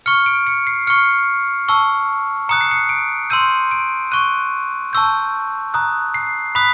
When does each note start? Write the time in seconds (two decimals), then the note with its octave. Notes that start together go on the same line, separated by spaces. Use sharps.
0.06 C#6 F6 C#7
0.26 D7
0.47 C#7
0.67 C7
0.87 C#6 F6 C#7
1.68 A5 C#6 E6
2.49 A#5 D#6 F#6 C#7
2.61 C7
2.71 C#7
2.89 D7
3.30 C6 E6 G6 D#7
3.71 D7
4.11 C#6 F#6 D#7
4.93 A5 C#6 E6 G6
5.74 A#5 D#6 F#6
6.14 C7
6.55 B5 D#6 F#6 B6